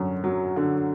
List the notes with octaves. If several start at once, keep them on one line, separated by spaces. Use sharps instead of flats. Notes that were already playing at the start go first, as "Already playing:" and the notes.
Already playing: F#2 D3 C#4
F#3
D3